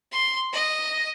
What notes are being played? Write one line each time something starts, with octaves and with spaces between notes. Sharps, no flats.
C6
D#5